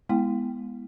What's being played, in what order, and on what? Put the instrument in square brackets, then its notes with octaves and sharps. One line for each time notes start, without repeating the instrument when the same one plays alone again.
[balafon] G#3 B3 E4 G5